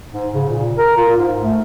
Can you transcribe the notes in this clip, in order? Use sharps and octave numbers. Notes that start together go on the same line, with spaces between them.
G#2
C#3
A#2
A#4
F4
G#2
A3